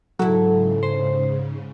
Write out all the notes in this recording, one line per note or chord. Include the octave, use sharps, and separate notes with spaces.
G#2 C#3 F#3 E4 A4
C5